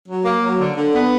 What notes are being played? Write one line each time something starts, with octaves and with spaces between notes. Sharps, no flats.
F#3
A#3
F#3
D3
D3
B3